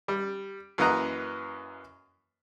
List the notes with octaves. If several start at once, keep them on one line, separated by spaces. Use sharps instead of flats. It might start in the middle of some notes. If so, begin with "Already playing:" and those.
G3
F#2 E3 A#3 D#5 F#5 A#5